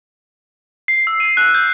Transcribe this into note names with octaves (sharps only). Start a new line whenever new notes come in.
C7
E6
D#7
F#6
G6